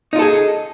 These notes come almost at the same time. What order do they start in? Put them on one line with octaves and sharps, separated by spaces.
D#4 F4 A4 G#4